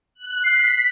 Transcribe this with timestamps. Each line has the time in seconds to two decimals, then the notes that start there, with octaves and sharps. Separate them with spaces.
0.14 F#6
0.44 B6 C7